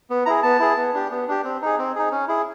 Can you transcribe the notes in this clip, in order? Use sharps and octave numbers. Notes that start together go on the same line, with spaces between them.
B3
E4 G#4 A#5
B3 A5
E4 G#4
B3
D4 G4
B3
D4 G4
C4
D#4 G#4
C4
D#4 G#4
C#4
E4 G#4